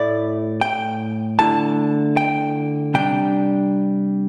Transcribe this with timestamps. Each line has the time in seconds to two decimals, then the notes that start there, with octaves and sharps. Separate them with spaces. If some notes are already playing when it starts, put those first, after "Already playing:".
Already playing: A2 A3 E4 D5
0.61 G5
1.39 D3 A3 E4 A5
2.17 G5
2.94 C3 G3 D4 G5